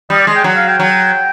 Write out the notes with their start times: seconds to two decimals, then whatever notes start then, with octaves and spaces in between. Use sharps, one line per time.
0.10 G3 D#5
0.19 D5
0.27 G#3 D#5
0.36 G5
0.44 F#3
0.56 F5
0.68 G5
0.80 F#3